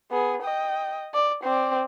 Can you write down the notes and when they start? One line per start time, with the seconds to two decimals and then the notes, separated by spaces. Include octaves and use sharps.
0.11 B3 G#4
0.42 D#5 G5
1.14 D5
1.44 C4 D5